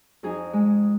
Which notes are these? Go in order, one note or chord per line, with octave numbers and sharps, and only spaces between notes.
F2 D#4 G#4
G#3